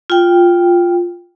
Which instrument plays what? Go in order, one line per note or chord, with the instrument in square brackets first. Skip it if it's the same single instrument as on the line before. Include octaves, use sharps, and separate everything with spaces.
[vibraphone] F4 G5